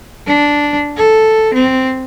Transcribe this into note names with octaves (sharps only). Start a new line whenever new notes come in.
D4
A4
C4